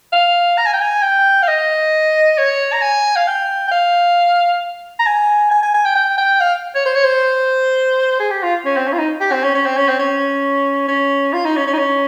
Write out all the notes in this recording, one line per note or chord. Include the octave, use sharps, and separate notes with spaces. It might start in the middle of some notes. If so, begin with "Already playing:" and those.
F5
A#5
G#5
G5
G#5
G5
F5
D#5
C#5
A#5
G#5
F5
G5
G5
F5
A#5
G#5
G#5
G#5
G#5
G5
G5
G5
F5
C#5
C5
C#5
C5
G#4
G4
F4
C#4
C4
C#4
F4
D#4
G4
C4
C#4
C#4
C4
C#4
C4
C#4
C#4
F4
D#4
C#4
C#4
D#4
C#4